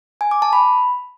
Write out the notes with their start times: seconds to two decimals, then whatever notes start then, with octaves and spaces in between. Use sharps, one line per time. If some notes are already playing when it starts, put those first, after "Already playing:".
0.21 G#5
0.31 D6
0.42 A5
0.53 B5